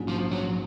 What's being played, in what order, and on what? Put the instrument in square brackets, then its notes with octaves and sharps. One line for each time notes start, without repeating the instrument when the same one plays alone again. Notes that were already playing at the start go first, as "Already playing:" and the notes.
Already playing: [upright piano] A#1 G#2 F#3 C#4
[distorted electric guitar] F3
F#3